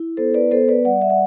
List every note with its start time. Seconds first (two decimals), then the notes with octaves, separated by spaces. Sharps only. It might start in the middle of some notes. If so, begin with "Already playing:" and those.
Already playing: E4
0.17 B3 A4 C5
0.34 B4 D5
0.51 B3 A4 C5
0.68 B4 D5
0.85 G3 D5 F#5
1.02 E5
1.10 F#5